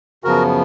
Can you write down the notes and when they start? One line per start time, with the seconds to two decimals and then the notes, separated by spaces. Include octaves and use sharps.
0.24 F#2 C#3 F3 B3 F#4 A#4